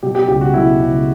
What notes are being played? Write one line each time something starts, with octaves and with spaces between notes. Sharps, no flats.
B2 G4
G4
C#2 G4
F#4
B2 E4
C#2